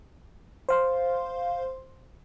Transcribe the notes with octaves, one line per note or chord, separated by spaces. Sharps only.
C5 F5 C6